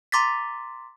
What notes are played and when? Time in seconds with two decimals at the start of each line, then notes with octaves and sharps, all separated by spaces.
0.12 A#5 C6 D6 A6 B6